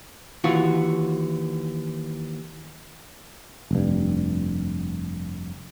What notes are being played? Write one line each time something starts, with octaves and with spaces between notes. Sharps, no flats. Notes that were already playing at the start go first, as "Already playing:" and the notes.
D#2 E3 F4 F#4
F1 G2